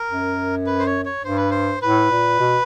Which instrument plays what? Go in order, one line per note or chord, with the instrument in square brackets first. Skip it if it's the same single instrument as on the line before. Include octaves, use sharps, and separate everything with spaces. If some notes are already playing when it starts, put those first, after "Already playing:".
Already playing: [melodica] A#4
[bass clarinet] F#2
[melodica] B4
C5
C#5
C#5
[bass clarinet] G2 [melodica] C5
[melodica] B4
C5
[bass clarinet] A2 [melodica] B4
[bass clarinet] A#2
B2